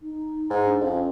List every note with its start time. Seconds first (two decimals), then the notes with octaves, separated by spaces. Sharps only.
0.01 D#4
0.50 G#2
0.65 D4
0.81 F2 C#4